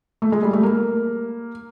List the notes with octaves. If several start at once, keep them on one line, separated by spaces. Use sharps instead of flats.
A3
G#3
G3
A3
A#3